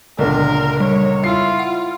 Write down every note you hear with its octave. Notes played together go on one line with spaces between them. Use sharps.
C#2 A#2 D3 A#4
G3 C#5
E4 F4 C7
F#5